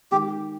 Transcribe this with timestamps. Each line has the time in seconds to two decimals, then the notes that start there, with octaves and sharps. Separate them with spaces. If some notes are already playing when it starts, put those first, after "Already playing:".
0.11 D#3 G#3 G4